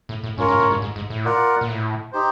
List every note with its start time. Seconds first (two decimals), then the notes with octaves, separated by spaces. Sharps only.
0.09 A2
0.24 A2
0.38 G#2 C#4 F4 A#4 C#5
0.48 G#2
0.60 A2
0.71 G#2
0.82 G#2
0.96 G#2
1.10 A2
1.25 F4 A#4 D5 F#5
1.61 A#2
1.69 A2
2.12 D#4 G4 C5